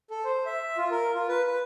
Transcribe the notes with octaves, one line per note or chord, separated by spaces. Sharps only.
A4
C5
E5
F4
A#4
F4
B4
B4